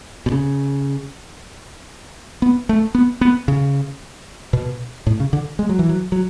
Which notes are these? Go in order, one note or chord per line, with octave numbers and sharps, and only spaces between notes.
B2
C#3
B3
A3
B3
B3
C#3
B2
A2
C#3
D3
G#3
F#3
E3
F#3
F#3